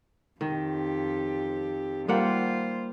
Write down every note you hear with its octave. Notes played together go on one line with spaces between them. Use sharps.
F2 D#3 G4
G3 A#3 F4 C5 F#5